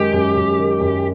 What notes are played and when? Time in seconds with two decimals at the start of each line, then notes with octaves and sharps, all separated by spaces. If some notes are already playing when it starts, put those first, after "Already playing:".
Already playing: F#2 D#3 G#3 G4
0.13 F#2
0.36 F#2
0.58 D#3
0.80 F#2